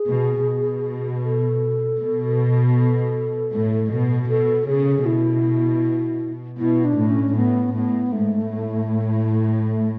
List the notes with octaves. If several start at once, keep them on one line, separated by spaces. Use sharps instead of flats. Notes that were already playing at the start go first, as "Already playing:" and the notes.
Already playing: G#4
B2
B2
A4
B2
A4
A2
B2
B2 A4
C#3 G#4
B2 E4
B2 E4
D4
A2
C#4
A2 B3
A2 B3
G#2 A3
A2
A3